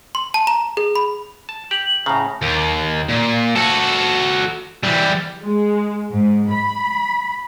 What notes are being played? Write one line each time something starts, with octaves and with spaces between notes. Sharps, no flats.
C6
A5
A#5
G#4
B5
A5
G4 F#7
A2 C#3 A#5
D#2
A#2
F#4 A4
E3 G3
G#3
G#2
B5